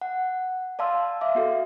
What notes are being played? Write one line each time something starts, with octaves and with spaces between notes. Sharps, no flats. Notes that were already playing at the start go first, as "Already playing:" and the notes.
F#5
D5 F5 A5 C6 E6
E5 F5 D6
B3 F#4 A4